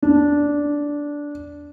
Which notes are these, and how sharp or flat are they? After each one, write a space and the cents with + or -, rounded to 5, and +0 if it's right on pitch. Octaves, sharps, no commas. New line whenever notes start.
D4 -10